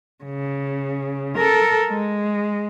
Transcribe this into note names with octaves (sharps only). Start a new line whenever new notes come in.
C#3
A4 A#4
G#3